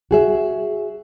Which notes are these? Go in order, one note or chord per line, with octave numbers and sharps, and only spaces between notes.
F#4 G#4 E5